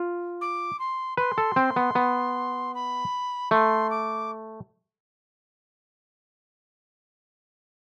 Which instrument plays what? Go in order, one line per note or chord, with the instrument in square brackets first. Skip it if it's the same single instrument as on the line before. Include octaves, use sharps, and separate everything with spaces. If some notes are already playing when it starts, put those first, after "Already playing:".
Already playing: [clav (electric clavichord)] F4
[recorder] D6
C6
[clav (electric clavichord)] B4 [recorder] C6
[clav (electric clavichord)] A4
C4
B3
B3
[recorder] B5
[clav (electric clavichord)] A3 [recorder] C6
[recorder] D6